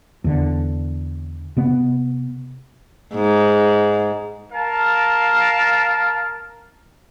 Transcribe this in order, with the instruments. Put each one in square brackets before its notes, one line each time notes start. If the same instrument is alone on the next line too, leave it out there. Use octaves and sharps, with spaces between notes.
[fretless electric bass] E2 D3
C3 B3
[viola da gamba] G#2
[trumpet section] A#4 F5 A5